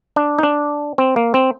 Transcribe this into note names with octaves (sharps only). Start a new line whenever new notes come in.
D4
D#4
D4
C4
A#3
C4